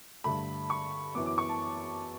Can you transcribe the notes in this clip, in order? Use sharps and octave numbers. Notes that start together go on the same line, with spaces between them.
G2 D3 A3 B5
C#6
F#2 E3 B3 D6
D6
C#6
A5